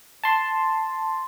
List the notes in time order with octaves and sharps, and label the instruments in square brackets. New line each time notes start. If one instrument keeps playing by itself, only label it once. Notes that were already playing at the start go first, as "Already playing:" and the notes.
[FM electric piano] A5 C6